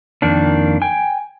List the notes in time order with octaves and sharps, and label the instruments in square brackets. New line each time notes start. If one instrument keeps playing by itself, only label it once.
[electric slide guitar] F2 D#3 A#3 D4
G5 G#5